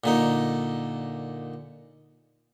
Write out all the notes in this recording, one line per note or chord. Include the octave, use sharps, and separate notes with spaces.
A#2 D3 D#4